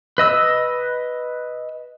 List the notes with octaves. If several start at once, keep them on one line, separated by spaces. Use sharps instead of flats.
B4 D#5 E6